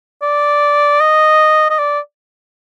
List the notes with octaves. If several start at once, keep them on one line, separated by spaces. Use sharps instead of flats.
D5
D#5
D#5
D5